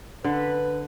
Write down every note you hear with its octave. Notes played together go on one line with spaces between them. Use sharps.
D3 B4